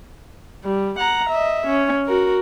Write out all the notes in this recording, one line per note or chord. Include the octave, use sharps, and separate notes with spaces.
G3
F#5 A#5
D#5 E5
C#4
F#4 A#4